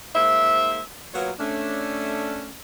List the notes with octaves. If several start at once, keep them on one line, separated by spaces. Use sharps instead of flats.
G#2 A#3 C5 E5
F#3 A#3 B3 F4 A#4 C#5
A3 C#4 D4